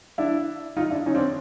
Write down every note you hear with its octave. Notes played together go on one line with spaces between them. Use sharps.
D4 E4
D#4 F4
D4 E4
C#4 D#4
C4 D4